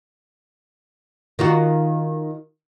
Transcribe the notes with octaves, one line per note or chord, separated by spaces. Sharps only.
D#3 F4 F#4